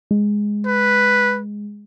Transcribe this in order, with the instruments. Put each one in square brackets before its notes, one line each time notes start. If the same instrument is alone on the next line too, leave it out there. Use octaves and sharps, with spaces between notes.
[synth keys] G#3
[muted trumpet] B4